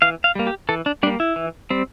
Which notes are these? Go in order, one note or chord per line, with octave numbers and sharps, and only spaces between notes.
E3 F5
F5
G3 A#3
G4
E3 A4
D4
G3 A#3 D4
E4
E3
G3 C4